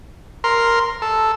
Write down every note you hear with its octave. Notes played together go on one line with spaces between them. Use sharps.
A#4 C6
A4